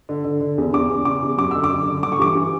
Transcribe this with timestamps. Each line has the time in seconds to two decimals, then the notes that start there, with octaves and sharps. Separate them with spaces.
0.09 D3
0.24 D3
0.41 D3
0.58 E2
0.73 E2 D6
0.90 E2
1.05 C#3 D6
1.23 E2
1.38 F#2 D6
1.51 D3 E6
1.64 D6
1.71 D3
1.87 D3
2.03 G2 D6
2.12 C#6
2.19 E3 D6
2.35 E3